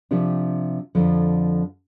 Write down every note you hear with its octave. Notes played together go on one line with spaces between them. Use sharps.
C3 F3 D4 G4
F2 D3 F3